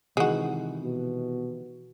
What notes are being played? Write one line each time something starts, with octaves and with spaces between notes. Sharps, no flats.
C3 D#3 E3 G#3 F#4
B2